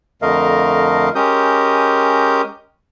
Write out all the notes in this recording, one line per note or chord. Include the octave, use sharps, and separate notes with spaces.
F2 D3 A3 A#4 D#5 F5
G#3 C#4 G4 A#4 D#6 G6